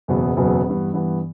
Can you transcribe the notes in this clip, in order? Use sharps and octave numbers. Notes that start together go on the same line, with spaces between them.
F#1 E2 B2 F#3 B3
F#1 E2 B2 F#3 B3
G2 E3 B3
G2 E3 B3